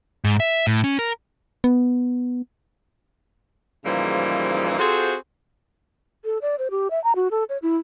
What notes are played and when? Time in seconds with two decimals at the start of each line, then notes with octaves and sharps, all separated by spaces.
0.24 G#2
0.40 E5
0.67 A2
0.84 C#4
0.99 A#4
1.64 B3
3.84 G#2 C#3 E3 F3 G3 A#3
4.78 C4 F4 F#4 G#4 A4 C5
6.25 A4
6.42 D5
6.59 C5
6.71 G4
6.91 E5
7.04 A#5
7.16 F#4
7.31 A4
7.49 C#5
7.62 E4